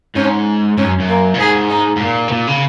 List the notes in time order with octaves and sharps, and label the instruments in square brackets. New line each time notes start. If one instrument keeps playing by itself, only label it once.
[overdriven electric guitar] G#2 [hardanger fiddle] C#4
[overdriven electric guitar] G#2 [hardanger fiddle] C#4
[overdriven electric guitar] F#2
F#2
[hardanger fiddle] A#3
[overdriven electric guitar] A#2
[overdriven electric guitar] G#2 [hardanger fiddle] G#4
[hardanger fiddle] D#4
[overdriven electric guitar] G#2
[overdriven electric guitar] A#2 [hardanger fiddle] A#3
[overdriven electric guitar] C#3
A#2
C#3